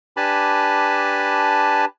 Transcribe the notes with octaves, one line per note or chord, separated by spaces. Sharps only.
D4 G4 B4 G#5 A5 B5